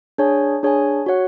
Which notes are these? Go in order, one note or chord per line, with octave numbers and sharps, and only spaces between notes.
D4 G#4 C#5 G#5
D4 G#4 C#5 G#5
F#4 C#5 F#5